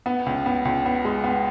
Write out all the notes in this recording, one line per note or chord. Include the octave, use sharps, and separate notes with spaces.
B3
C#2
B3
C#2
B3
G#3
B3